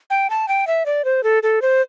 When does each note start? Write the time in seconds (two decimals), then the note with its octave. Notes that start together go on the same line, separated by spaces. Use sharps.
0.10 G5
0.30 A5
0.48 G5
0.67 E5
0.86 D5
1.05 C5
1.24 A4
1.43 A4
1.62 C5